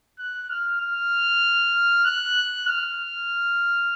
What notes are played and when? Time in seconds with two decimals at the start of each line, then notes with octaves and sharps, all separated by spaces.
0.19 F#6
0.50 F6
0.80 F6
2.05 F#6
2.67 F6